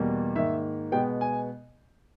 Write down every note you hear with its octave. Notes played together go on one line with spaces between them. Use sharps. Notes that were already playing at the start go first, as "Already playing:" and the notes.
Already playing: E2 B2 G3 A#3
G#2 D#3 A#3 E5
B2 G#3 B3 G5
G#5